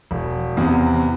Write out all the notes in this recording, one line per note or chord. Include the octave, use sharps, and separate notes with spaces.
E1
E2 C3